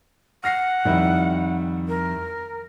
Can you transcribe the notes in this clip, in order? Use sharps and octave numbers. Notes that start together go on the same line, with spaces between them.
F#5 F6 A#6 C7
F2 G#2 D#3 G3 E4
A#4